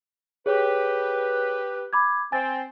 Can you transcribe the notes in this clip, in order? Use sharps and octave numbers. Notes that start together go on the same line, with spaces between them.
G4 G#4 B4 C#5
B5 D6 G#6
C4 G#5 A6